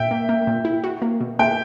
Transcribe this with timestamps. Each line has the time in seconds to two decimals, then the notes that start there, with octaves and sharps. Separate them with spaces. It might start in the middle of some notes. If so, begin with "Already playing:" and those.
Already playing: A#2 E5 G5
0.11 A#3
0.29 A#3
0.47 A#2
0.65 E4
0.84 F#4
1.02 A#3
1.21 B2
1.39 A#3 E5 G5